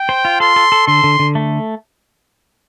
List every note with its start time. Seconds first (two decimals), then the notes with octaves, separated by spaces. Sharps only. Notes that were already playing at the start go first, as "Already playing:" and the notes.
Already playing: G5
0.09 C5
0.25 F4
0.40 A4 C6
0.56 A4
0.72 A4
0.87 D3 C6
1.04 D3
1.19 D3
1.35 A3